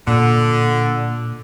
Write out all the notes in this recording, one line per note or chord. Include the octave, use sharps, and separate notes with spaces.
A#2 D3